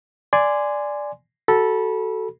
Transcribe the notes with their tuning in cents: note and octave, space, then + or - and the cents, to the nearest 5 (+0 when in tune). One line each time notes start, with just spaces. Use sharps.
D5 +0 G#5 +0 C6 -15
F#4 +25 A4 +0 B5 -30